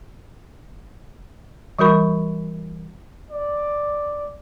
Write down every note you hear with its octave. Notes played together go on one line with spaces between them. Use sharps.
E3 G3 F#4 A#4 B5 C#6
D5